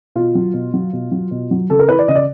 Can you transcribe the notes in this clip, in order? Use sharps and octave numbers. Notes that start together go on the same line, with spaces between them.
B2 F4
F#3
B2
F#3
B2
F#3
B2
F#3
C#3 A4
A#4
E3 B4
D5
C#3 D#5
D5